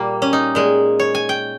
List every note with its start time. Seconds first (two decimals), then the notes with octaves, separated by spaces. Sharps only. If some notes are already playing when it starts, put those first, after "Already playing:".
Already playing: A#2 G3 A#3
0.22 C#4
0.33 D#4
0.55 A#2 G#3
0.99 C#5
1.15 G#5
1.29 G5